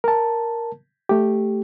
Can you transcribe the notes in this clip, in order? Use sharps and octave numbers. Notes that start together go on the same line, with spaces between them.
A#4 A5
A3 G4